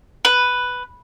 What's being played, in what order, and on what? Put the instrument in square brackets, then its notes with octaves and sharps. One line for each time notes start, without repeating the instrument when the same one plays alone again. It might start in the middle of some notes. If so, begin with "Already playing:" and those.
[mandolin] B4